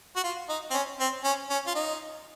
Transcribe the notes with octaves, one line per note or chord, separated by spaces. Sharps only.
F#4
F4
D#4
C4
C#4
C4
C#4
C#4
F4
D#4